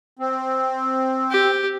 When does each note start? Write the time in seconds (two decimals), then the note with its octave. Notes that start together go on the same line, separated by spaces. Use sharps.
0.19 C4
1.31 G4